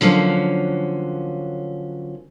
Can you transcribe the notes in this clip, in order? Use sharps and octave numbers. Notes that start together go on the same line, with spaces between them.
D3 F3 F#3 A#3 C#4